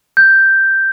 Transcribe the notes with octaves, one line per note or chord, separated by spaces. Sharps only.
G6